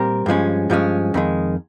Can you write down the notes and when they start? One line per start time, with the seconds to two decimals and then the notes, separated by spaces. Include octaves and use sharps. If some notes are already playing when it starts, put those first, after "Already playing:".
Already playing: A#2 G3 C4 G4 A#4
0.26 G2 F3 G#3 C#4
0.70 G2 F3 G#3 C#4
1.14 F2 D#3 G#3